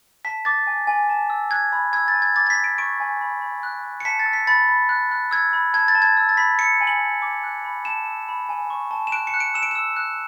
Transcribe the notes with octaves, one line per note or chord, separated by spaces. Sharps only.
A5 B6
D6 A6
G#5
G#5
A5
E6
F#6 G#6
B5
E6 G#6
A6
G#5
G#6
D6 A6
A6
B6
D6
D7
C#6 D7
G#5
B5
B5
F#6
F#6
C#7
A5 B6
A6
E6
B6
B5 A6
B5
F#6
F#6
E6 G#6
B5
A5 G#6
A6
A5
G#6
E6
A6
B5 B6
E6 C#7
G#5
F#7
B5
D6
F#6
B5
A5 E7
E6
B5
G#5
C#6
A5
E7
F#6 D7
C#7
F#6
D7
E6 E7
D7
E6 E7
F#6